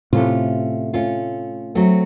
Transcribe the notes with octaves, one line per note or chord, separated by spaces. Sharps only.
A2 C3 A3 C#4 F4
A3 C#4 F4
F#3 A3 C4